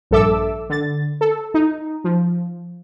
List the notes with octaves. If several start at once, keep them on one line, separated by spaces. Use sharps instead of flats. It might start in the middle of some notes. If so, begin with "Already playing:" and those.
A#1 G2 A4 E5 D6 E6
D3 A6
A4
D#4
F3